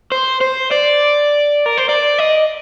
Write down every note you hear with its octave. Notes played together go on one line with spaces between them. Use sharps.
C5
C5
D5
A#4
C5
D5
D#5